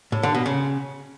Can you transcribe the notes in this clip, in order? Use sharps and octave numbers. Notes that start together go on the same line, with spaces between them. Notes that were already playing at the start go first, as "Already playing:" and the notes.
A2
D3
B2
C#3